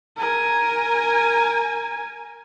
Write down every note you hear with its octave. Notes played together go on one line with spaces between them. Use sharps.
A#4 G#5